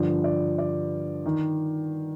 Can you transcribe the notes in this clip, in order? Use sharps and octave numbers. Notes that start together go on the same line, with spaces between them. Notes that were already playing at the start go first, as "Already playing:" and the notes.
Already playing: G2 D3 F3 D5
D5
D5
D#3